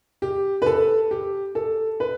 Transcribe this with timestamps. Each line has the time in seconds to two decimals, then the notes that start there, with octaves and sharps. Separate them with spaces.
0.22 G4
0.62 B4
0.66 A4
1.11 G4
1.55 A4
2.00 B4